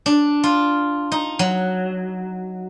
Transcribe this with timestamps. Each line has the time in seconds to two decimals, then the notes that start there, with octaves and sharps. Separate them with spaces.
0.06 D4
0.44 F4
1.12 D#4
1.39 F#3